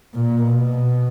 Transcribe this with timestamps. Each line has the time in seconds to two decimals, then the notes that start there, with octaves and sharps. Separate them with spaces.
0.14 A#2
0.43 B2